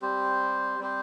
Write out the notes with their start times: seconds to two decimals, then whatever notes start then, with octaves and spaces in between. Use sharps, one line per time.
0.02 G3 C4 G4 C5
0.79 G3 C4 G4 C5